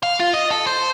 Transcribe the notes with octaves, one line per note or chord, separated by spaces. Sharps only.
F5
F4
D#5
A4
C5